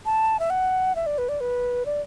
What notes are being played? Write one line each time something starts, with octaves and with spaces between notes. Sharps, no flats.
A5
E5
F#5
E5
D5
B4
D5
B4
D5